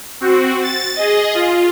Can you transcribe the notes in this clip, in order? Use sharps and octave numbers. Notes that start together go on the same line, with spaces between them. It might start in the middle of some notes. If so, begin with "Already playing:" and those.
C4 F#4
A6
G#4 D#5
F4